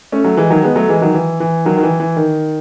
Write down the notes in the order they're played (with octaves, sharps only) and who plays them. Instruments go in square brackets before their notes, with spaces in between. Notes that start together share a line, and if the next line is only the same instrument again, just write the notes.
[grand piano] A3 C#4
F#3 A3
E3 G#3
D#3 F#3
G#3 B3
F#3 A3
E3 G#3
D#3 F#3
E3
E3
D#3 F#3
D#3
E3
E3
D#3